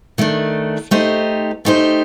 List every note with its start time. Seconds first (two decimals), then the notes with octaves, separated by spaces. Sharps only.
0.18 D#3 A3 D4
0.91 A3 D#4 G4 C5
1.65 A3 D#4 G4 C5